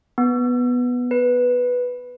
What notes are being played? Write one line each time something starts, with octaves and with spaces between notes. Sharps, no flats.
B3
B4